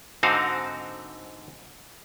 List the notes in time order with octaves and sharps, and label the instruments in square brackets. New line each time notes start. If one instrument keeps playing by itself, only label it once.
[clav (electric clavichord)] G#2 D3 C4 D#4 F#4 F5